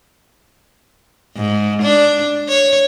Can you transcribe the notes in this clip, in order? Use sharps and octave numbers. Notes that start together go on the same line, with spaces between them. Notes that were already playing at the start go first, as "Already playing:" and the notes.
G#2
D4
C#5